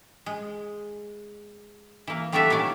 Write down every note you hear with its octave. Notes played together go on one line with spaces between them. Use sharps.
G#3
E3 A#3
G3 A3 B3 G4 A4 E5
A#2 D#3 C#4 E4 D5